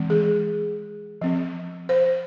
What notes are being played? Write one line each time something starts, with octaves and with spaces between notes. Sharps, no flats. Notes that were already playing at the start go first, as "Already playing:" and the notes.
Already playing: E3 G#3 C4
G#4
F3 C4
C5